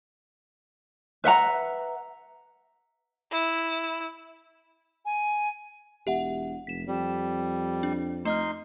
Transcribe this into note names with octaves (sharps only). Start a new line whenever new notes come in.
B4 E5 F#5 A#5
E4
G#5
E1 G4 E5 F#5
F1 B6 E7
F2 G3
D4
A3 D#4 D#5 C6 F6